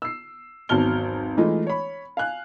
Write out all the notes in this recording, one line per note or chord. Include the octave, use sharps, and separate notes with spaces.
E6 C7
G#1 E2 F#3 A5 F6 G7
E3 G#3 A3 D#4 F4 D#5
C#5 B5
F5 G#5 F#6